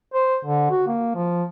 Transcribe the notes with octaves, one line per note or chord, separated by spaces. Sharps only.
C5
D3
F#4
A#3
F3